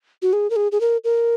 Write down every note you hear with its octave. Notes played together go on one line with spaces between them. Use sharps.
F#4
G#4
A#4
G#4
G#4
A#4
A#4